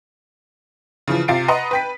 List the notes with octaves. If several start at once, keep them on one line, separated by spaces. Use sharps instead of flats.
C#3 E3 F3
C3 F4 A6 C7 D7
B4 D#5 F#5 A#5 C6
B4 G5 B6